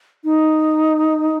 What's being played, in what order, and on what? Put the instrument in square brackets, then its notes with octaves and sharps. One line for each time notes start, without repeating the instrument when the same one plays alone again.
[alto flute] D#4